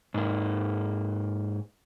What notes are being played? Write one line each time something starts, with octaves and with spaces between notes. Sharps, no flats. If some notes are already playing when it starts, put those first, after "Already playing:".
G#2 A#3